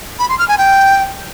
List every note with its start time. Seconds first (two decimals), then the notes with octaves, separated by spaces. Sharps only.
0.19 B5
0.29 C6
0.39 F6
0.48 G#5
0.58 G5